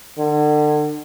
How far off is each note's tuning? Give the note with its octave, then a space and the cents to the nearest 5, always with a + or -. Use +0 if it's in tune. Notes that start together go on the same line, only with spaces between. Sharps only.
D3 +35